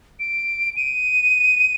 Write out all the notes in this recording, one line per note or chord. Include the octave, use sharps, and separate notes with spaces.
D7
D#7